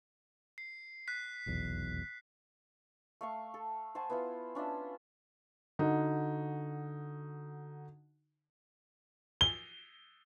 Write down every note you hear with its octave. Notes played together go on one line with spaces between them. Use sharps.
C7
F#6 B6
F1 B1 E2
A3 F5 C#6
A4
C5 F#5 G#5 A5
B3 E4 F4
C#4 D4 F4 E5
D3 D#4 F#4
G7